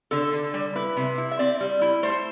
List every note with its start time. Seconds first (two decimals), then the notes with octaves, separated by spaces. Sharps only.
0.11 D3 A4
0.33 D3
0.54 G3
0.76 E4 B4
0.97 C3
1.18 E4
1.31 E5
1.39 C4 D5
1.60 G3
1.82 E4
2.03 A3 C5